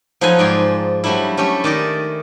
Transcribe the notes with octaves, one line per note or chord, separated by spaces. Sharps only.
F3 F#3 D#4 A4 B4 G#5
G#2 G#4 D5 G5
F#3 G3 A3 D4 E4
A3 C#4 G4 A4
D#3 D5 D#5